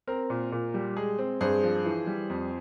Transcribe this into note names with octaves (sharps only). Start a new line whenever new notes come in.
C4 A#4
A#2
A#2
G3
G#3 G#4
C4
G2 G#4 C5
F3
E3
G3
F2